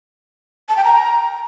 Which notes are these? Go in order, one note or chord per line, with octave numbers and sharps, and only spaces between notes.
A5
G5
A#5